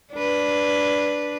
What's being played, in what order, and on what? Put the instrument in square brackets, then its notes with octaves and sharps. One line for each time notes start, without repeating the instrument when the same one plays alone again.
[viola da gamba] D4 B4